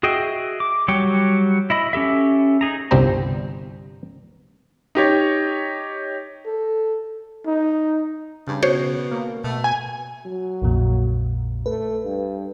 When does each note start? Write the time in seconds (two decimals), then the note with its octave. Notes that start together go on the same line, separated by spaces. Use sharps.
0.03 F#4 G#4 D#5 E5 G5
0.60 D6
0.88 F#3 G3 C#5 G5 D6
1.70 E4 D#5 B5
1.93 C#4 G4 A4 E5
2.61 D#4 G#4 A#5
2.91 G1 C2 G3 C4 C5 A#5
4.95 D#4 G4 C#5
6.46 A4
7.46 D#4
8.47 G2 C#3
8.63 B2 F#4 C5 C#5
9.11 A#3
9.44 B2 A3
9.64 G#5
10.25 F#3
10.62 A#1 F2 A#2
11.66 A3 B4
12.05 G2